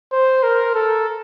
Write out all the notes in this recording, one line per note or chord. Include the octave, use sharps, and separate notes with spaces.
C5
A#4
A4